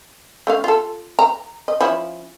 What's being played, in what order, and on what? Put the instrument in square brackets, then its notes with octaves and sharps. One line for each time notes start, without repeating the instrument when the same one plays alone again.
[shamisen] A3 C#4 F5
F4 A4
A#5
D#5
F3 C#4 E4